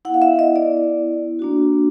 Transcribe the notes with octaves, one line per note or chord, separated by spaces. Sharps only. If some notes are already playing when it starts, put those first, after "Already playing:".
B3 E4 F#5
F5
E5
D#5
D5
A#3 D4 F#4